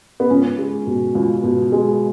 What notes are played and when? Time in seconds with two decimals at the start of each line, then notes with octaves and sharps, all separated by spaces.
0.20 B3
0.30 C#2 C#4
0.58 G#3
0.87 B2
1.15 C#2
1.43 B2
1.72 G#3